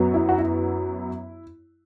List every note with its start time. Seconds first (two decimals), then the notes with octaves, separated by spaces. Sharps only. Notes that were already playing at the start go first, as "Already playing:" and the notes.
Already playing: F#2 F#3 B3
0.14 E4
0.29 F#4
0.38 E4